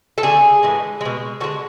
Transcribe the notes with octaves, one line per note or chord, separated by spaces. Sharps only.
A4
D3 A3 G#4
A2 E3 G#3
B2 G#3
D3 G#3 F#4